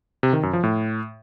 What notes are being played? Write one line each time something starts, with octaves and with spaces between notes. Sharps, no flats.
C3
D#3
F#2
F3
A2